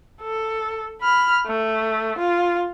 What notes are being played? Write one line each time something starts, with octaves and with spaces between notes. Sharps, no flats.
A4
B5 F6
A3
F4